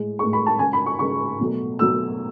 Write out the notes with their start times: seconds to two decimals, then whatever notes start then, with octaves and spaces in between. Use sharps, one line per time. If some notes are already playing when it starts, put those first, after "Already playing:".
Already playing: A2 G#3
0.19 G#3 C#6
0.23 A2
0.33 B5
0.46 A5
0.59 C#3 G#3 G#5
0.73 B5
0.86 C#6
0.99 C#3 G#3 C#6
1.40 B2 F#3 A3
1.79 B2 F#3 A3 E6